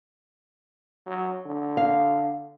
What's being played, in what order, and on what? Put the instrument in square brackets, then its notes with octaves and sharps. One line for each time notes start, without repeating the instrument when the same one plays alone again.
[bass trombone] F#3
D3
[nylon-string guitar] F5